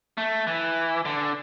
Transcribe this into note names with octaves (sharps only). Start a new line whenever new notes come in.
A3
E3
D3